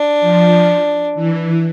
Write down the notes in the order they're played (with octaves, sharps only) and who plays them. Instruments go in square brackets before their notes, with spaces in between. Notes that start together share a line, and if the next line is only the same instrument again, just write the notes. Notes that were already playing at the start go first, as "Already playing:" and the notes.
Already playing: [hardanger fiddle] D4
[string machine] F3
E3